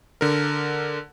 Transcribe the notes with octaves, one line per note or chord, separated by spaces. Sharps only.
D3 A#4